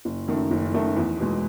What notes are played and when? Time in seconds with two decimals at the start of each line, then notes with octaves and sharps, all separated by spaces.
0.05 F#1
0.28 F#2 D#3 A3
0.51 F#1
0.74 F#2 D#3 A3
0.97 E2
1.20 B2 G#3